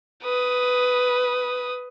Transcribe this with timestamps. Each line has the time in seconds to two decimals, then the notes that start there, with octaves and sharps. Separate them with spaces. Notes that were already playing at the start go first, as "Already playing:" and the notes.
0.23 B4 D#6